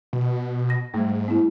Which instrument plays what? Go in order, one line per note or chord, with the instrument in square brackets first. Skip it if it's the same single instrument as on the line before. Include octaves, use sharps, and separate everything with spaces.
[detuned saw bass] B2
[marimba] A#6
[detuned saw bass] G#2 [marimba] G3 A3
[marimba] B3 E4